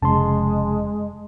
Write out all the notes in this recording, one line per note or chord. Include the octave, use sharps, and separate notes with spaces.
F1 C#3 G#3 A5 C6